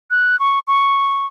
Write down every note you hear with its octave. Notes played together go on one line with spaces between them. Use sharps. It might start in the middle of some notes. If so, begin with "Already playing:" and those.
F#6
C#6
C#6